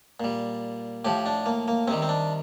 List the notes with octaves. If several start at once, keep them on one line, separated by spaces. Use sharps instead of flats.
A#2 G3
A2 F3 G4
D4
A#3
A#3
C3 D#3 G3 C4
C4
D4